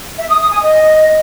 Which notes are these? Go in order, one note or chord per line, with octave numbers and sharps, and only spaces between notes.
E5
D#6
D#6
G#5
D#5